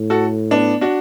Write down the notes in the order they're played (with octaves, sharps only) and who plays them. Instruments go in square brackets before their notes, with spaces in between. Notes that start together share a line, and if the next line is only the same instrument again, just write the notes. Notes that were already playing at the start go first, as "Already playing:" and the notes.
Already playing: [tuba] A2
[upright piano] F#4 A4
B3 D4
D4 F#4